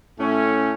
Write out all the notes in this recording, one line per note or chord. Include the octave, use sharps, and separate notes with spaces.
A2 A3 C#4